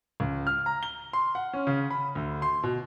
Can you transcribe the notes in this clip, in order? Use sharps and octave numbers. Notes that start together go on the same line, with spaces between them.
C#2
F6
A#5
G7
C6
F#5
C#4
C#3
B5
D2
C6
B2